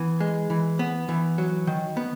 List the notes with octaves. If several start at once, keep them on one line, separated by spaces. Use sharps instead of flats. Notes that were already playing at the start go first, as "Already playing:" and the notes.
Already playing: E3 B3
G#3
E3
B3
E3
F#3
D#3
B3